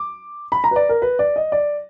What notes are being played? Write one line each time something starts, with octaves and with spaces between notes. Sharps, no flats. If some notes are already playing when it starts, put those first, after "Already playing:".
Already playing: D6
B5
A#5
B4
D5
A#4
B4
D5
D#5
D5